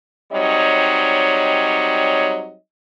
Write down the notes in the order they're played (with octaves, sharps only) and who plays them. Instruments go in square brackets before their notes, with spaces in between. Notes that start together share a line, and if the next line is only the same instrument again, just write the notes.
[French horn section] F#3 G3 C4 D#4 C#5 D#5